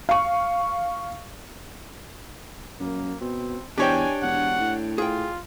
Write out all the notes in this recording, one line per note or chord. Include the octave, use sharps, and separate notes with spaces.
F5 C#6
F#2 A#3
B2 C4
E2 D4 G4 C5 C#5 D#5 G5 G#5
E1 F#5
A2
F4 G#4 G5